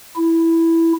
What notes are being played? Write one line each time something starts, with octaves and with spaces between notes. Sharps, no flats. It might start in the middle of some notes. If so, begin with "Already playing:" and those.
E4